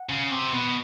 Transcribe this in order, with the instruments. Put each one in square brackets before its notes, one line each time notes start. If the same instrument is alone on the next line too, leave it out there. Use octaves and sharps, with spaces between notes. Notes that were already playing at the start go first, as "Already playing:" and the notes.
Already playing: [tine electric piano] F#5
[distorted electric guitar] C#3
C3
B2